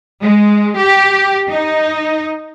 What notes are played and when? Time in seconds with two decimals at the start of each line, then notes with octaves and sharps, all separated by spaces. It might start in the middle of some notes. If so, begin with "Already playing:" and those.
0.23 G#3
0.78 G4
1.48 D#4